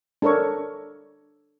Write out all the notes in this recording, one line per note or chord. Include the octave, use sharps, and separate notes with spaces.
D4 A4 A#4 C#5 C#6